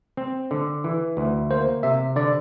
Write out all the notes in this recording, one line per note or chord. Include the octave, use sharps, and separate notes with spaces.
C4
D3
E3
D2
A#3 C5
C3 E5
D3 D5